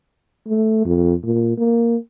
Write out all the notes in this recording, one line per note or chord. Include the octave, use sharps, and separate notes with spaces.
A3
F2
A#2
A#3